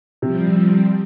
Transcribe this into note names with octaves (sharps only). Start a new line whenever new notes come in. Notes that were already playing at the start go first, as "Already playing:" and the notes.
C3 F3 G3 C4